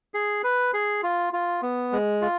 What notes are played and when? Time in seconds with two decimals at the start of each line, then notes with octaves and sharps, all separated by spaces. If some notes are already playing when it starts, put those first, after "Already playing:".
0.14 G#4
0.44 B4
0.73 G#4
1.03 F4
1.33 F4
1.62 B3
1.92 G#3
2.22 F4